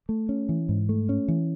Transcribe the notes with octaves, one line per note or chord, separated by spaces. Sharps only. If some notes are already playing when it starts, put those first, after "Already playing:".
A3
C#4
E3
G#2
A3
C#4
E3